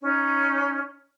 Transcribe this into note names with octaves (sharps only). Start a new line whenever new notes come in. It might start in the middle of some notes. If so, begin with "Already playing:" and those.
C#4 D#4 C#5